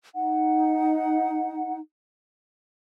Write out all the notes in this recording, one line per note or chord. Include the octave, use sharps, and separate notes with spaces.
D#4 F#5